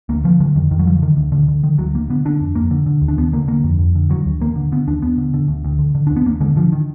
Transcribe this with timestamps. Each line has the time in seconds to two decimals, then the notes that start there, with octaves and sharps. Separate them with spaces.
0.09 D2 A#3
0.24 D3 F3
0.40 D3 F#3
0.55 F2 D#3
0.71 F2 D#3
0.79 F#3
0.87 D3 F3
1.02 D3 D#3
1.17 D2
1.32 D2 D3
1.48 D3
1.64 D3 D#3
1.78 D2 F#3
1.95 D2 A#3
2.10 D3 B3
2.25 D3 D4
2.41 F2
2.55 F2 A#3
2.71 D3
2.86 D3
3.02 D#2
3.08 D4
3.17 D#2 B3
3.33 D3 A#3
3.48 D3 A#3
3.64 F2
3.79 F2
3.95 D3
4.10 D3 F#3
4.26 D#2
4.41 D#2 A#3
4.56 D3
4.72 D3 B3
4.87 D#2 D4
5.02 D#2 B3
5.18 D3
5.34 D3
5.48 D2
5.65 D2
5.79 D3
5.95 D3
6.07 D#2 D4
6.16 B3
6.26 D#2 A#3
6.40 D3 G#3
6.56 D3 F3
6.72 D#3